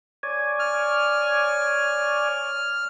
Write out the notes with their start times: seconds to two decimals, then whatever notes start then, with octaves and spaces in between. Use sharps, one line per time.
0.23 C#5 D5 G#5
0.59 F6